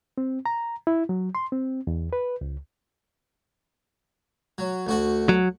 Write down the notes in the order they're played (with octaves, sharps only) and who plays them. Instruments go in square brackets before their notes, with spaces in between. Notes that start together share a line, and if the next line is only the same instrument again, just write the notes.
[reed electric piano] C4
A#5
E4
F#3
C6
C4
E2
B4
C#2
[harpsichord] F#3
D2 F#4 F#5
[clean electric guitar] F#3